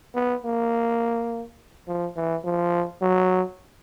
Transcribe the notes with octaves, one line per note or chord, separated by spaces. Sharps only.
B3
A#3
F3
E3
F3
F#3